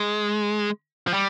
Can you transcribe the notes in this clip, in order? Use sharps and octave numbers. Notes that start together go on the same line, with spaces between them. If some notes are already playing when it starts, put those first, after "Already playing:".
Already playing: G#3
F3
G3